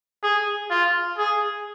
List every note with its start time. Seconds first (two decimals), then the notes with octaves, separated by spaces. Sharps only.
0.23 G#4
0.71 F4
1.18 G#4